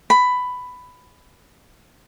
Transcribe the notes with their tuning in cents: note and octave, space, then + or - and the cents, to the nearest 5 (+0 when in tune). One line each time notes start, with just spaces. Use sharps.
B5 +10